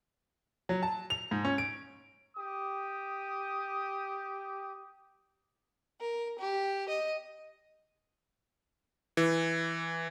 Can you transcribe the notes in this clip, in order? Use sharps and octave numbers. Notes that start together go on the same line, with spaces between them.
F#3
A5
F7
G#2
C#4
D7
G4 D#6
A#4
G4
D#5
E3